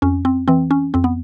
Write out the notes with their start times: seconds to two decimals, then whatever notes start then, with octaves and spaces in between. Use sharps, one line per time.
0.02 F2 C#4
0.25 C4
0.48 E3 C4
0.71 C#4
0.94 F2 C4
1.04 B3